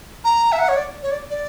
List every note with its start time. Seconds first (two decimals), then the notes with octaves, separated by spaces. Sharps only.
0.24 A#5
0.52 E5
0.59 F#5
0.68 C#5
0.76 D5
1.03 C#5
1.11 D5
1.30 D5